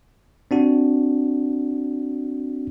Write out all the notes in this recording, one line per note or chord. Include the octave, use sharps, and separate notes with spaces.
C4 D4 F#4